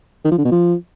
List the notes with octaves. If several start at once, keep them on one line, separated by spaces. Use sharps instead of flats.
D#3
F3
D3
B2
F3